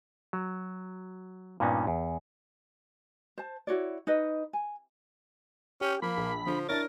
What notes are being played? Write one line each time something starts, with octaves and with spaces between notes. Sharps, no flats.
F#3
G2 A#2 A#3 B3 C#4 D#4
E2
C5 A5
E4 F#4 C#5 D5
D#4 B4 D#5
G#5
C#4 G4
F3 A#3 B5
A#1
D3 F3
D4 E4 A#4 C#5 A6